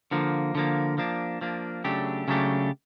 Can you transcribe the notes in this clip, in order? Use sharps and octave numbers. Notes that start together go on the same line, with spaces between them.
D3 F3 A#3
D3 F3 A#3
F3 A#3 D4
F3 A#3 D4
C#3 F#3 A3 D4 G4
C#3 F#3 A3 D4 G4